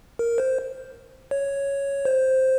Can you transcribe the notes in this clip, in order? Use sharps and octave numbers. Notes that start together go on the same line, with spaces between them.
A#4
C5
C#5
C5